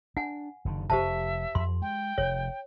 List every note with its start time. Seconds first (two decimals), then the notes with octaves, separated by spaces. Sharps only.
0.17 D4 F#5 G#5
0.65 F#1 D3 D#3
0.90 F1 G4 C5 E5 A5
1.55 F2 C6
1.82 G#3 G5
2.18 F1 C#5